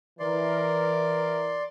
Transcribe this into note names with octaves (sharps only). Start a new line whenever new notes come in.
E3 A#4 D5 C6